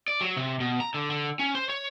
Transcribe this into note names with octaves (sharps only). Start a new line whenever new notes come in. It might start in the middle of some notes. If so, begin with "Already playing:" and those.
D5
F#3
C3
B2
A#5
D3
D3
C#4
C5
C#5